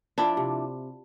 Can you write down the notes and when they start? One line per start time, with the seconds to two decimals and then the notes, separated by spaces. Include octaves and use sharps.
0.18 F3 D4 E4
0.37 C3